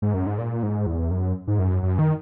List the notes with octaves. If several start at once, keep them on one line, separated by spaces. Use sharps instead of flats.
G#2
F#2
G#2
A#2
G#2
E2
F#2
G#2
F#2
F#2
D#3